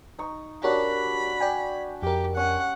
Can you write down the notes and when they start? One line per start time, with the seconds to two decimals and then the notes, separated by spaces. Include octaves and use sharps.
0.18 D#4 C#6
0.64 D4 F#4 G4 A#4 C#5 A5 B5
1.40 D5 G5 G#5
2.02 F2 G4 A#4
2.37 C#4 F#5